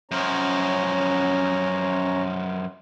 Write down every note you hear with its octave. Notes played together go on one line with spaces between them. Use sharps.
F#2 F3 C#4 C#5 A#5